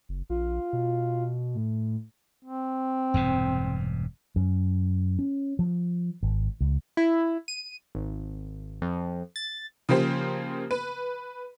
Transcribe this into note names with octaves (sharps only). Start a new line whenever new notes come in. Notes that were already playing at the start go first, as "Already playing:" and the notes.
F#1
A#1 F4
B2
A2
C4
E1 G2 C3
F#2
C#4
F3
G#1
C#2
E4
D#7
G#1
F2
A6
C#3 F3 A#3 G4 C5
B4